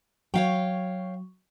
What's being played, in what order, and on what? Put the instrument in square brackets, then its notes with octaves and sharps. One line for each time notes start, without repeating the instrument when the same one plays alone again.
[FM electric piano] F#3 [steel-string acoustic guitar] C#5 F5 G5